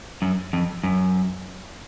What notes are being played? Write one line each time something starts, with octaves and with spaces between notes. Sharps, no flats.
F#2
F2
F#2